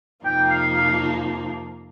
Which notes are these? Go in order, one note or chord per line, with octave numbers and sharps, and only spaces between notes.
F2 C3 F3 A#3 D#4 G5
F5
F5